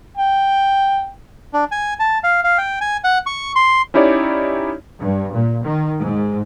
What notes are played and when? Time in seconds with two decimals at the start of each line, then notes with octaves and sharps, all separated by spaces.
0.18 G5
1.53 D4
1.72 G#5
1.99 A5
2.24 F5
2.44 F5
2.58 G5
2.81 G#5
3.04 F#5
3.26 C#6
3.55 C6
3.94 C#4 D#4 E4 G4 C#5 D5
4.99 G2
5.33 A#2
5.65 D#3
6.00 G#2